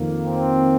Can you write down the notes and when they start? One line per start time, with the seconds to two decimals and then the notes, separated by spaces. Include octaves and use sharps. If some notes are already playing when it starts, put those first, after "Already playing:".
Already playing: F2 D#3 A#3
0.22 C4